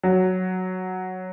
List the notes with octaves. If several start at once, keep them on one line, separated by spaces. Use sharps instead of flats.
F#3